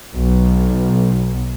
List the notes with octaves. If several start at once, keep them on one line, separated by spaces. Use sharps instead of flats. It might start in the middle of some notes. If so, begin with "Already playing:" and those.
B1